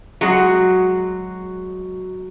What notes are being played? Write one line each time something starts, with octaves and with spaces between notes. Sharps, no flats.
F#3 G#3 F#4